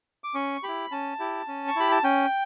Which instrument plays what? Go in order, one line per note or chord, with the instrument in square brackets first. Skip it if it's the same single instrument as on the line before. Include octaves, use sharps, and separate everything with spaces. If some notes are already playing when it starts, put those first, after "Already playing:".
[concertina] D6
C#4 C#6
E4 G4 B5
C#4 A5
E4 G4
C#4
C#6
E4 G4 B5
A5
C#4 G5